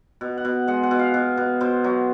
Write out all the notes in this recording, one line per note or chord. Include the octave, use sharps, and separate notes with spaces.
B2
F#5
B2
G#3 F#5
F#5
B2
F5
B2
B2
B2 C5
F#3